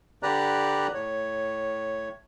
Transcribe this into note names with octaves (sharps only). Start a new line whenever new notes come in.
D3 G4 B4 D5 A#5 F#6
A2 C#5